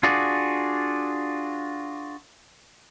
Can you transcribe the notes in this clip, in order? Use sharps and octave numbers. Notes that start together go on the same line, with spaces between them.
D4 F4 F#4 G#4 D5